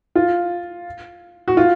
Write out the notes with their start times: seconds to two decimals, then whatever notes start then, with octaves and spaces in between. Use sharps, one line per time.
0.15 F4
1.48 F#4
1.57 F4